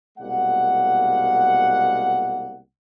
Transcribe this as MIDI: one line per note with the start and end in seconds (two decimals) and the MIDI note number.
0.18 2.60 36
0.18 2.60 47
0.18 2.60 56
0.18 2.60 58
0.18 2.60 78